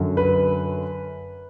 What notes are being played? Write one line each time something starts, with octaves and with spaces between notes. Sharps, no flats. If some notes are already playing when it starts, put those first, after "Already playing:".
Already playing: F#2 D3 F#3
B4